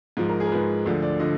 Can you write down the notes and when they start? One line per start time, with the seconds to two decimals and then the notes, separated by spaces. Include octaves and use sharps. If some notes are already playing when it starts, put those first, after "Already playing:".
0.17 G#2 F3
0.29 A#4
0.40 G#4
0.47 A#4
0.52 G#2 F3 B4
0.86 D2 D3 F3
1.03 D5
1.20 D3 F3 D#5